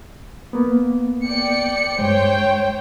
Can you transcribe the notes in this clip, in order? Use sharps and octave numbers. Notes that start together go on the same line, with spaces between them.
A#3 B3
D5 G5 C#7
G2 G#3 C5 C#5 G5